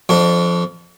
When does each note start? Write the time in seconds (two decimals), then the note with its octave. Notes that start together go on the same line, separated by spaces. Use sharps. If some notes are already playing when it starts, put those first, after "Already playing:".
0.09 F2 D4